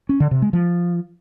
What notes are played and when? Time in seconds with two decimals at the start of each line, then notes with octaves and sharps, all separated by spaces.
0.09 C#4
0.20 D3
0.31 C3
0.42 G#3
0.53 F3